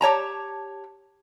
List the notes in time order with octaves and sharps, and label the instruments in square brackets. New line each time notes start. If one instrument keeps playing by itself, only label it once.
[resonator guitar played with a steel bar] G4 C#5 A5 A#5